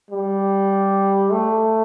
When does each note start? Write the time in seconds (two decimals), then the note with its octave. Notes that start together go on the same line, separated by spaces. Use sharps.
0.11 G3
1.32 A3